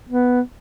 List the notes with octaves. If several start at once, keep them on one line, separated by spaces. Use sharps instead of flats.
B3